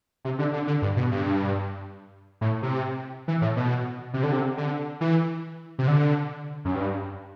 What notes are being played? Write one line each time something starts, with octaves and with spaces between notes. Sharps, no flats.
C3
D3
D3
D3
G2
B2
G2
A2
C3
E3
A2
B2
C3
D3
C3
D3
E3
C3
D3
F#2
G2